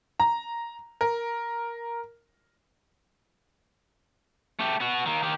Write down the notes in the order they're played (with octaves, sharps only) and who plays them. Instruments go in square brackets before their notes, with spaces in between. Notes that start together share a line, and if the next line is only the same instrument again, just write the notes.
[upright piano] A#5
A#4
[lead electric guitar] A3 G4
B3 F#4
D#3 A#3
D#3 G4